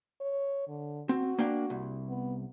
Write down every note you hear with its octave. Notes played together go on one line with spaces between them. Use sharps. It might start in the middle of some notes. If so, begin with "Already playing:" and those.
C#5
D3
C4 F#4
A#3 D4 G5
C2
B3